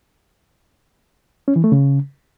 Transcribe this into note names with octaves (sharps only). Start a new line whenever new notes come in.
C#4
E3
A3
C#3